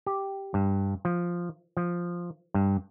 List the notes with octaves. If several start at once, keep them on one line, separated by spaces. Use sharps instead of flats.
G4
G2
F3
F3
G2